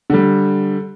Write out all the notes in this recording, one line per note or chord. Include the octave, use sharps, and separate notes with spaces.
D3 G3